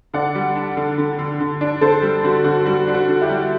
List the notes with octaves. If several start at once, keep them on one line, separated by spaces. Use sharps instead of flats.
D3 D5 F#5
G3
D4
D3
D3
D3
D3
D4
D3 A4 C5
G3
D3 F#4
D3 F#4
G3 F#4
D4
F#4
D3
E4 G4
G3